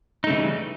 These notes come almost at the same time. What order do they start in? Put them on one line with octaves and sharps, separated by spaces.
D#4 A3 C#3 E3 G3